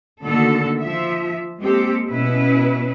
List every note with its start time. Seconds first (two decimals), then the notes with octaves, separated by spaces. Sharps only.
0.25 D3 D#3 A3 A#3 F#4 A4
0.82 F3 E5
1.60 G#3 A#3 C4 G4 A4
2.08 B2 C#4 E4 B4